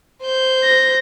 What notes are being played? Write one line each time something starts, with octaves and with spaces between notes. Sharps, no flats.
C5 G6
A#6